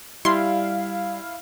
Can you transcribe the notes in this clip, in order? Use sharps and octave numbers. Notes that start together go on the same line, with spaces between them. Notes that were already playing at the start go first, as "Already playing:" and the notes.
G3 E4 F5 C6